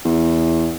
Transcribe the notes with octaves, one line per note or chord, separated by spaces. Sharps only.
E2